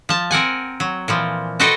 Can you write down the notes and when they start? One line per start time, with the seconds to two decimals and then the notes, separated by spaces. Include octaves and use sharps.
0.09 F3 A5
0.31 C4 A#4 F#5 G#5
0.80 F#3
1.08 A#2 E3 F3
1.60 F#4 A4 B4 C5 D#5 G5